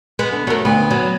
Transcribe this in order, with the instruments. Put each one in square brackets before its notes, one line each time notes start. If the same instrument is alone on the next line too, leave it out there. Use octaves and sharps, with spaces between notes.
[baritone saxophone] G#3 [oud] B3
[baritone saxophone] D3
[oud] F#3 A#4 [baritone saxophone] A3
[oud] D2 C4 [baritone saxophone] B3
[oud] F#3